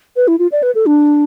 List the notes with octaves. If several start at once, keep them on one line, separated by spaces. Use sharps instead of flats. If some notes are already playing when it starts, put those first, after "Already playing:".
B4
E4
F4
D5
B4
A4
D4